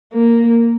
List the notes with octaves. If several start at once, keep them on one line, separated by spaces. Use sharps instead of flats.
A#3